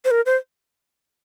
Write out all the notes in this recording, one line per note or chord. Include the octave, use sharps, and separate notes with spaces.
C5
A#4
C5